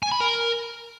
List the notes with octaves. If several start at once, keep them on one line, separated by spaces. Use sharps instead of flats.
G#5
B5
A#4